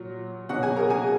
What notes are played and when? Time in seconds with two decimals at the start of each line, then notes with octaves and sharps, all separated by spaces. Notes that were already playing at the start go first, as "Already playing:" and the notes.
Already playing: A#2 F#3
0.49 B2 F#3 F#4 F#5
0.63 G#4 G#5
0.76 A#4 A#5
0.90 G#4 G#5